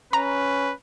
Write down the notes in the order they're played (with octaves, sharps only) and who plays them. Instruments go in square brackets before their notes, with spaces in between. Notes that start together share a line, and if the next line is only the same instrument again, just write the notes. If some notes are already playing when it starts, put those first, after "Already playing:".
[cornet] C#4 [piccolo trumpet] B4 [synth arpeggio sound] A#5